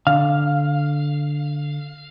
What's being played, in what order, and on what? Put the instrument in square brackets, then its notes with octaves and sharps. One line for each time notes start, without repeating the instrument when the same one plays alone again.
[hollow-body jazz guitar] D3 [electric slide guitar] F5